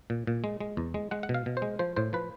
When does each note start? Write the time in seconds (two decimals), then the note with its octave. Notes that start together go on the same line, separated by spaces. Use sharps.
0.10 A#2
0.27 A#2
0.44 G#3
0.61 G#3
0.77 E2
0.94 G#3
1.11 G#3 F#5
1.23 F#5
1.29 B2
1.34 F5
1.46 B2
1.57 C5
1.62 G#3
1.79 F3 C5
1.96 A2 C5
2.13 F3 B4